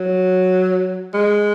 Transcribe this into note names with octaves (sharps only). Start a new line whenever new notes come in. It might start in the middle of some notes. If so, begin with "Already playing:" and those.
Already playing: F#3
G#3